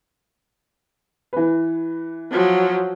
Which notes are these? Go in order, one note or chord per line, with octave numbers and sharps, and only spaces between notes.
E3 B4
F3 F#3